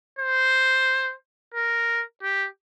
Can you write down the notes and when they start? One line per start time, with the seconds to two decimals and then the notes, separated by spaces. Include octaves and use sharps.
0.19 C5
1.54 A#4
2.23 G4